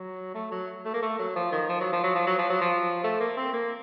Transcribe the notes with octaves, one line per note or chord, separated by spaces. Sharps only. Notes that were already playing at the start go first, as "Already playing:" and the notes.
Already playing: F#3
A3
F#3
A3
A#3
A3
F#3
F3
D#3
F3
F#3
F3
F#3
F3
F#3
F3
F#3
F3
A3
A#3
C4
A#3